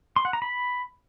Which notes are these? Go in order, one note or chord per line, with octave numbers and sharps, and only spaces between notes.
C6
F#5
A#5
B5